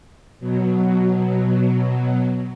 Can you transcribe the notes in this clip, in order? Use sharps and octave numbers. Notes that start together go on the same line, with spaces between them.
B2 F#3